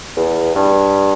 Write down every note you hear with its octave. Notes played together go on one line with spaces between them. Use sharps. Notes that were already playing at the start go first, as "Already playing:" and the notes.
E2
G2